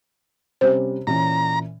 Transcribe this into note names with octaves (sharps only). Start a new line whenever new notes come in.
C3 G3 C#4 C5
A#2 E3 C#4 A#5